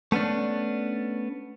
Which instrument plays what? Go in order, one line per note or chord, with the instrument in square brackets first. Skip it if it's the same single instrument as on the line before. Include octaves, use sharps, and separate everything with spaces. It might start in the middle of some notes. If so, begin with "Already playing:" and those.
[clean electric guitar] A3 B3 C#4 D4